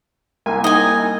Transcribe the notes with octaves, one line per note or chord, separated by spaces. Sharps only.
C2 A#3 G#5
D#4 D#5 G#5 A#6